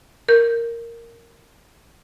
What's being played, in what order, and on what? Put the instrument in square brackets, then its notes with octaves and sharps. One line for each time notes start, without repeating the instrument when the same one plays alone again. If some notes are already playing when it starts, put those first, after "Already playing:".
[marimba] A#4 G6